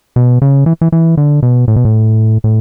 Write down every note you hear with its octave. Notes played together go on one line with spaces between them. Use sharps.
B2
C#3
E3
E3
E3
D3
B2
A2
B2
A2
A2